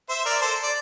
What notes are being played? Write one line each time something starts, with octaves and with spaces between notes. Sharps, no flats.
C5 E5
A#4 D5
A4 C5
D5